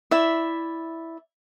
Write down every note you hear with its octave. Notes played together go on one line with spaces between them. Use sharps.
E4 D5 E5